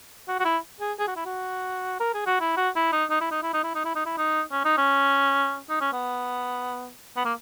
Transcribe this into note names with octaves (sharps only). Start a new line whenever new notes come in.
F#4
F#4
E4
G#4
G#4
F#4
E4
F#4
A#4
G#4
F#4
E4
F#4
E4
D#4
D#4
E4
D#4
E4
D#4
E4
D#4
E4
D#4
E4
D#4
C#4
D#4
C#4
D#4
C#4
B3
B3
A#3